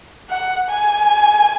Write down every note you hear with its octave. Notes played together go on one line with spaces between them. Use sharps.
F#5
G#5